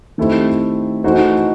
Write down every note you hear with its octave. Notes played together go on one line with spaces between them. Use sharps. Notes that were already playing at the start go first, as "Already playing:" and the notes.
D#3 A3 C4 E4 G4
E3 A3 D#4 F#4 C5